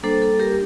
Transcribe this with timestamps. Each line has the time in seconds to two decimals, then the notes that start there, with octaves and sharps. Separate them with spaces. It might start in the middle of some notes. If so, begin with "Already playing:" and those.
0.03 G3 A#3 D4 A4 C5
0.22 A4
0.40 G4 A#4